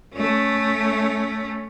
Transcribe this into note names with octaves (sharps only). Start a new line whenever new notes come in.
A3 C#4